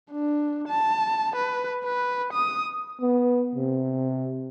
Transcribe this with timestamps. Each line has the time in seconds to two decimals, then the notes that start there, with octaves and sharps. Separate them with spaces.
0.11 D4
0.68 A5
1.36 B4
1.84 B4
2.33 D#6
3.01 B3
3.55 C3